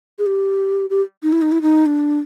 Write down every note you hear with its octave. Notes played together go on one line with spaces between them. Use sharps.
G#4
G4
G4
D#4
E4
D#4
E4
D#4
D4